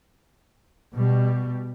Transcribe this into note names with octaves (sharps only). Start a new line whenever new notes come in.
B2 G3